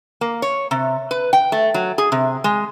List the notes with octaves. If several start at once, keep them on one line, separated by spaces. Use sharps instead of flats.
A#3
C#5
C3
B4
G5
A3
F#3
G#4
C3
G#3